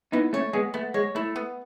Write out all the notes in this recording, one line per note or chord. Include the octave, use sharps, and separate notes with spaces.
B3 D#4 E4
A3 C#4 C#5
G#3 B3 G#4
A3 B3
G#3 C#5
A3 E4
B3